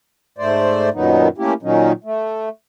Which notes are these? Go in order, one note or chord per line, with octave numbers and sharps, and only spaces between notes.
G#2 A3 C5 D5
F#2 A#2 D#3 F#3 B3 D#4
A3 A#3 C#4 E4 G4
A#2 D#3 F#3 C#4 D#4
A3